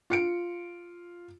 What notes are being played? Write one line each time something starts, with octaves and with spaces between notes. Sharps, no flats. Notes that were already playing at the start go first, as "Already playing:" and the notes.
F4 C#7 D7